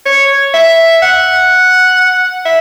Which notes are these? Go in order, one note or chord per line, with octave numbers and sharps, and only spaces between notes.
C#5
E5
F#5
E5